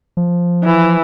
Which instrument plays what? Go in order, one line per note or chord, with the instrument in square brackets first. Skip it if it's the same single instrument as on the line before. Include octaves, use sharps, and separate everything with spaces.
[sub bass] F3
[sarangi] E3